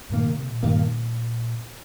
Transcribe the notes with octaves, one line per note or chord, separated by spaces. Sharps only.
G2 A#2 D#3 A#3
C3
C3
A#2
G2 D#3 A#3